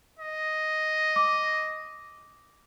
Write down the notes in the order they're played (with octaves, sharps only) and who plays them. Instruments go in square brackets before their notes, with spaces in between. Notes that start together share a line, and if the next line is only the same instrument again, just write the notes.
[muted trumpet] D#5
[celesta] D6